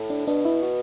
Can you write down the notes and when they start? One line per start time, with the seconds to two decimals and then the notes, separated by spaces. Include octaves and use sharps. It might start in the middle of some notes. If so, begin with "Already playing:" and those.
Already playing: A2
0.10 D4
0.27 B2 D4
0.45 E4
0.63 F#4